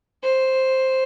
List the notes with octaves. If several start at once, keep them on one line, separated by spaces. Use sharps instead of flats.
C5